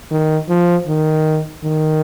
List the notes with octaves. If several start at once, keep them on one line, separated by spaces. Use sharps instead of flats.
D#3
F3
D#3
D#3